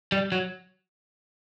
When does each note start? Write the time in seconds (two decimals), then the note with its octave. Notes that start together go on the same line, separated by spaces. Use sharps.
0.12 G3
0.32 F#3